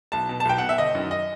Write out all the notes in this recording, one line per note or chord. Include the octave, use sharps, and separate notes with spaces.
B1 A5
B2
A5
B1 G5
B2 F#5
E5
G1 D#5
F#2 D#3
D#5